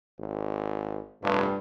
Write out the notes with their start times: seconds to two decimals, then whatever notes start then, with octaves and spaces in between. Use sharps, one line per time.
0.19 G#1
1.22 F1 G2